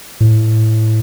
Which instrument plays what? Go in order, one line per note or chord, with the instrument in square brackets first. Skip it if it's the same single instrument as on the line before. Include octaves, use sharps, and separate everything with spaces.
[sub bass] A2